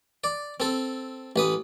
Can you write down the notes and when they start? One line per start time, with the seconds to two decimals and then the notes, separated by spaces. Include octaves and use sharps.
0.24 D5
0.60 C4 A4
1.36 A1 B4 D#6